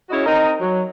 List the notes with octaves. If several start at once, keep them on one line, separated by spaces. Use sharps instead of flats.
C#4 E4 F#4 G#4 C#5 D#5
C4 D#4 A#4 D#5
F#3